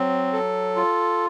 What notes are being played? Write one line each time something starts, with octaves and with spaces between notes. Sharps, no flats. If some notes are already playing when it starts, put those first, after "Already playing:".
Already playing: F#3 C4
A4
F4